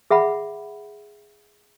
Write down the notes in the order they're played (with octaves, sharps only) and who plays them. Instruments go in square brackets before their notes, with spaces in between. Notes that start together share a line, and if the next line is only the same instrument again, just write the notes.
[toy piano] G#4 E5 F#5 B5